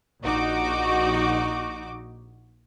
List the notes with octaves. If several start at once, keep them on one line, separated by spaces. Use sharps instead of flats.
A#1 D#4 F#4 D6